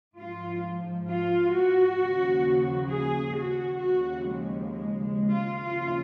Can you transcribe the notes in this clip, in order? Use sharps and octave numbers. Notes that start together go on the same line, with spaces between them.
G#2 F3 F4
F4
F#4
D#2 C#3 F3
G#4
F#4
D#2 C#3 F3 F#4
G#3
G#3
G#3
F4
D#2 C#3 F3 F4